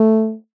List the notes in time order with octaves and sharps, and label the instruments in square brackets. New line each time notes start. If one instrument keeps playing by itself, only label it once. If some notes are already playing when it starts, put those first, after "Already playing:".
Already playing: [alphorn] A3